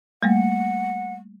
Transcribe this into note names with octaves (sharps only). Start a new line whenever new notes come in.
G3 A3 A#3 F#5